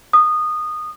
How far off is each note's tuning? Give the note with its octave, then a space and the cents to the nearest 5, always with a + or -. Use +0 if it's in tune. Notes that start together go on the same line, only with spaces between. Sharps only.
D#6 -20